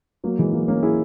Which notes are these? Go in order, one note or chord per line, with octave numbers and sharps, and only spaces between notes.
F#3 A#3
E3 G#3
F#3 A#3
A#3 C#4
E4 G#4